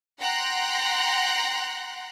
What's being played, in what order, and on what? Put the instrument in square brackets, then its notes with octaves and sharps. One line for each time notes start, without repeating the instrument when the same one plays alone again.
[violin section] F#5 G5 A#5 C6 F#6